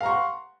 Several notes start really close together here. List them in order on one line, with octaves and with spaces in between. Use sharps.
F5 A#5 C#6 C6 F#5